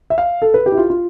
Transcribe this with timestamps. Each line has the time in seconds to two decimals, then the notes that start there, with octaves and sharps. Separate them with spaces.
0.10 E5
0.18 F5
0.42 A4
0.54 B4
0.66 G4
0.72 E4
0.78 F4
0.90 F4